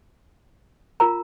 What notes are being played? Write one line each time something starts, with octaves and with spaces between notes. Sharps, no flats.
F4 A#4 A#5